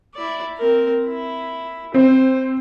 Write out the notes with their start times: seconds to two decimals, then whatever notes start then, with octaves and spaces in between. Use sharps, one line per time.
0.15 E4 D5
0.58 C4 A#4
1.08 E4
1.94 C4 C5